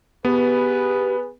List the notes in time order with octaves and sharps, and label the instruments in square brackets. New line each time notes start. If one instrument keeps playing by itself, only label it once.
[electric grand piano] B3 [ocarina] G4 [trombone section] G#4 B4